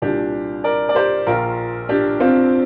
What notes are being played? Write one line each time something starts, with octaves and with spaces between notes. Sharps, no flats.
C2 A#2 D4 G4
A#4 D5
D5
G4 C5
A#1 A#2 F4 A#4
D4 G4
C4 F4